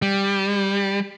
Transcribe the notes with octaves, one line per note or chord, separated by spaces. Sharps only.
G3